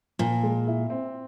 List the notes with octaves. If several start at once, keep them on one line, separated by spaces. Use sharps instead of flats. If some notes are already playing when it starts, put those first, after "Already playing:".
A#2 F3
G#3
E4
C4